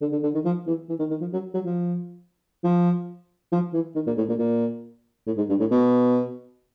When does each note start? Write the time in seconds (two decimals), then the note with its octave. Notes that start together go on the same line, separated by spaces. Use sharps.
0.01 D3
0.12 D3
0.23 D3
0.34 D#3
0.45 F3
0.67 E3
0.89 E3
0.99 D#3
1.10 D#3
1.21 F3
1.33 F#3
1.54 F#3
1.65 F3
2.64 F3
3.52 F3
3.73 E3
3.95 D#3
4.07 A#2
4.17 A2
4.29 A#2
4.39 A#2
5.26 A2
5.37 G#2
5.49 G2
5.60 A2
5.71 B2